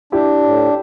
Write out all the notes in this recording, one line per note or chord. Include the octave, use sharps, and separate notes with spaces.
D4 E4 G4
A2